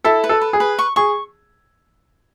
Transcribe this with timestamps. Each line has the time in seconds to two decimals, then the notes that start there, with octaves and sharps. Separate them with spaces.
0.04 E4 A4
0.24 B4
0.29 A4
0.41 B4
0.53 G#4
0.60 B4
0.79 C#6
0.96 G#4 C#6